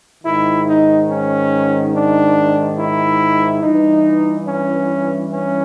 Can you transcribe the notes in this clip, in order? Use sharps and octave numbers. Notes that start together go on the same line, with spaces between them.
G#2 D#3 E4
D#4
C#4
D4
E4
G2 E3 D#4
C#4
C#4